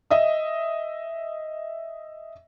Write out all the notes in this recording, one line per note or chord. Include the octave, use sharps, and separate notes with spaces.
D#5 E5 D#6